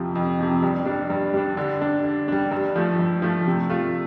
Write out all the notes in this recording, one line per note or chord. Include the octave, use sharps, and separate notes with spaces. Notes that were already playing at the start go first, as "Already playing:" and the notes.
Already playing: F2 C3 F3
F2
C3 F3
G2
G3 D4
G2
G3 D4
D3
G3 D4
D3
G3 D4
G2
F3 A3
G2
F3 A3
C3
A3 F4